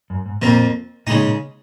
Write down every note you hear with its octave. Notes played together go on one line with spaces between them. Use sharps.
F#2
G#2
F2 A#2 F3 A#3
A#2 C#3 G#3 D#4
A#2